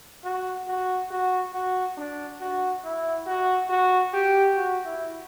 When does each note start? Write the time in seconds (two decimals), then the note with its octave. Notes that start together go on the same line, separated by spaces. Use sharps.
0.24 F#4
0.67 F#4
1.11 F#4
1.54 F#4
1.97 D4
2.41 F#4
2.84 E4
3.27 F#4
3.70 F#4
4.13 G4
4.56 F#4
4.85 E4